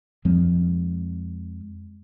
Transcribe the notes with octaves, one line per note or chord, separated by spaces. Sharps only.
F2 F3 G#3 C4